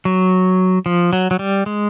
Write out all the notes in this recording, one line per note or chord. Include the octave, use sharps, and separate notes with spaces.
F#3
F3
F#3
F#3
G3
G#3